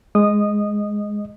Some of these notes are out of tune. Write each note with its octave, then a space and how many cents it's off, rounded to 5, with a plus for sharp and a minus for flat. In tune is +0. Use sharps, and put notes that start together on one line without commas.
G#3 +0 D#5 +0 D#6 -15